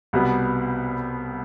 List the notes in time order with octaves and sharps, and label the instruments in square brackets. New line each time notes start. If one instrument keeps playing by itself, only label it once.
[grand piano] C2 B2 G3 B3